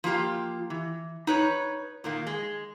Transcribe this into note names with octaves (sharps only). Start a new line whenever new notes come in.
F3 A#3 F4 G4
E3
D#4 B4 C#5
A#2 D#3 A#3
G#3